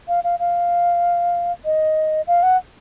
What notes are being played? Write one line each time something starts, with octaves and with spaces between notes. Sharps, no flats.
F5
F5
F5
D#5
F5
F#5